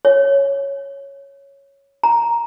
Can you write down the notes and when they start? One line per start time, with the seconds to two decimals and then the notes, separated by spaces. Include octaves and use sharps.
0.05 C#5
2.04 A#5